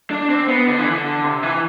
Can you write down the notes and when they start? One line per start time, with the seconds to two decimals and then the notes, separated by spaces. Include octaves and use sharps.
0.11 D4
0.30 C4
0.48 B3
0.67 D3
0.79 E3
0.91 D3
1.24 C3
1.43 E3